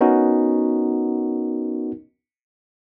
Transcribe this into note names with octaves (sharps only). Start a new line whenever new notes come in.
B3 C#4 D#4 F#4 A#4